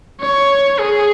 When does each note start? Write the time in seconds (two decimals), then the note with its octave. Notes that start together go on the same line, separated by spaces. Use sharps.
0.21 C#5
0.79 G#4